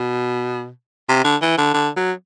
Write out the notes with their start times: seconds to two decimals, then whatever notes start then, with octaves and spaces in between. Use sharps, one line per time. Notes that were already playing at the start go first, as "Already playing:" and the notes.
Already playing: B2
1.09 C3
1.24 D3
1.42 E3
1.58 D3
1.74 D3
1.97 F#3